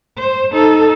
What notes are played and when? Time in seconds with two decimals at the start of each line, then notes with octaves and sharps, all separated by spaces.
0.18 C5
0.53 D#4 A4